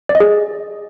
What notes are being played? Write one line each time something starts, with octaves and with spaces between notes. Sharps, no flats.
D5
D#5
G#4